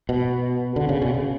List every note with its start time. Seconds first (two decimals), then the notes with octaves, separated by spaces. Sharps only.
0.09 B2
0.76 D3
0.89 C#3
1.02 B2
1.14 C#3